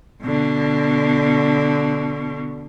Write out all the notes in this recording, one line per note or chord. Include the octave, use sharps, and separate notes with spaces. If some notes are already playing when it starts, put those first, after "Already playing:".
B2 D3